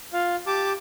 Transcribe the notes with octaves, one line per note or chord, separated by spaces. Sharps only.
F4 F5
G4 A5 D6